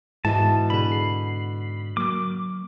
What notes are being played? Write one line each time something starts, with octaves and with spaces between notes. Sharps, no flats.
G#2 B2 E3 A5
B2 D3 G#4 B5
C7
F#3 A#3 D6